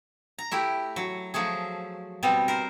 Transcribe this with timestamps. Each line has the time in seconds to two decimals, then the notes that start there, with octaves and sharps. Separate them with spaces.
0.39 A#5
0.51 A3 E4 G4
0.96 F#3
1.34 F3 F#3 A3 G#4
2.23 B2 G3 B3 C4
2.48 A#4 C5